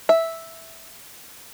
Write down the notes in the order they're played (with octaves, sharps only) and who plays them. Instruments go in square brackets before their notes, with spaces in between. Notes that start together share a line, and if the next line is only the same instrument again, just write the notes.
[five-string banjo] E5